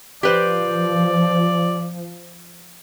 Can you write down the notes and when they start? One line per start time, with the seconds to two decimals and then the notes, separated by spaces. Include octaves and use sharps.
0.23 F3 G4 B4 C5 D5